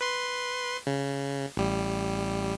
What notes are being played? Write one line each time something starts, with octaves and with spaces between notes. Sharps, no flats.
B4 C6
C#3
A1 G3